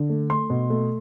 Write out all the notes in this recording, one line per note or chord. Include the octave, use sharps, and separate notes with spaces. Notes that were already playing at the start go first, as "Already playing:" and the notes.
Already playing: D3
A3
A3 C6
B2
A3